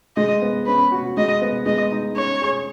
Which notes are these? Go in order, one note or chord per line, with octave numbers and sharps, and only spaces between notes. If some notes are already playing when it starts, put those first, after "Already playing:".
G#3 D#5
B3
C#4 B4
F#4
G#3 D#5
B3
G#3 D#5
D#4
C#4 C#5
G#4